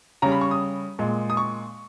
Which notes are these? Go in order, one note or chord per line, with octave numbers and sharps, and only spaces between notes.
C#3 G3 A#5
B5
C#6
D#6
A#2 G#3
D#6
C#6